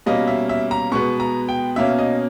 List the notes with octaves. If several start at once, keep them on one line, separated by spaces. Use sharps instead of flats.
B2 G3 A#3 C#4 D#5
E5
E5
A#5
B2 G#3 B3 C#6
A#5
G5
B2 A#3 C#4 E5
D#5